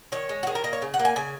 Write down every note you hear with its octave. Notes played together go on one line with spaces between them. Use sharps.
D#3 C#5
G#3
F#4
D#3 G#4
A#4
A#3 D#5
C#5
C#3
F#5
A#3
G#5
C#3 G#5